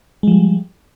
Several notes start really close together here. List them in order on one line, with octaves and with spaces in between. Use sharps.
G#3 F3 G3